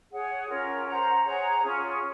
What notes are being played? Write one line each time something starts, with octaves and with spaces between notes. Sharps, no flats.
G#4 C#5 F#5
C#4 F4 A#4 C#5
C5 F#5 A#5
G#4 C#5 F#5 A#5
C#4 F4 G#4